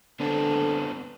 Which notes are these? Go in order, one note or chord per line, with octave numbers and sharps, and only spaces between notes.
D3 B3 C4 D4